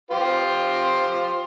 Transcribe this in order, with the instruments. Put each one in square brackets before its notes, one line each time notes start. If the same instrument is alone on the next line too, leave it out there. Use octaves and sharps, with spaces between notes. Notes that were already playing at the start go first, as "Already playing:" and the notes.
[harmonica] F4 G4 C5